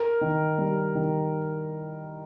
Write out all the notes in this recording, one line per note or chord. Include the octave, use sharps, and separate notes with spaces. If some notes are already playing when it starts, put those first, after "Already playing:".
Already playing: A#4
D#3
G3
D#3